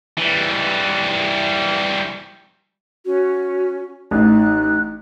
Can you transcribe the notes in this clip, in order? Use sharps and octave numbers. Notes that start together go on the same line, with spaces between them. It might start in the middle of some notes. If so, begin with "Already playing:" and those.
E3 G3
C#4 F#4
A1 D#4 F#6